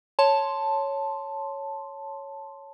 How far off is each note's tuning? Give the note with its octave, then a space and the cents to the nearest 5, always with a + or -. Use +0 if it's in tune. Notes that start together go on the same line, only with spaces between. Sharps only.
C#5 +0 A5 +0 C6 +0